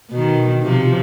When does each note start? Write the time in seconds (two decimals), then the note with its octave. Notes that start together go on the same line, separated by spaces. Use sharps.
0.11 B2 D#3
0.63 C3 F3